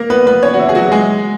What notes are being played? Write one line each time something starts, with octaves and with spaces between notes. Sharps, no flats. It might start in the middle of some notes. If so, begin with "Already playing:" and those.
Already playing: A#3 A#4
B3 B4
B3 B4
C#4 C#5
F#4
E3 E4
G#4
F#3 F#4
G#3 G#4